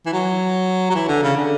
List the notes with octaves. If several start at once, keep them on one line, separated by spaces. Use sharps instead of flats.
E3
F#3
F#3
E3
D3
C#3
D3